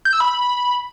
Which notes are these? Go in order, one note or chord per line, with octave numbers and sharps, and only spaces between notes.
G6
E6
B5